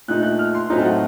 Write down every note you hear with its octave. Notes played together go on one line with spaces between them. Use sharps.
A#2 A3 D#4 F#6
F#6
F6
C6
A2 F#3 A3 C4 D#4 A#5
A5
F#5